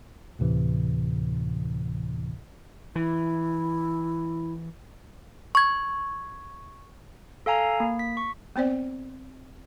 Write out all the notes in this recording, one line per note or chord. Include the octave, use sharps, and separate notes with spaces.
D2 A2 C3 E3
E3 E4
C#6 G#6
A4 F5 G#5 A#5
A#3
B6
C#6
B3 C4 C5 D5